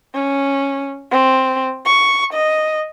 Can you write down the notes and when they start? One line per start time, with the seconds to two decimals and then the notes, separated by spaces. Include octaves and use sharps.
0.14 C#4
1.11 C4
1.85 C#6
2.33 D#5